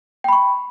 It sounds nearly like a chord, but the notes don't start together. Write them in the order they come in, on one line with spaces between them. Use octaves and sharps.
G5 B5 C#6